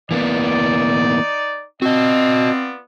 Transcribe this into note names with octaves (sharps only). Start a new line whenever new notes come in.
E3 A#3 B3 D#4 D5
B3 C4 F4 F#4 D5 D#5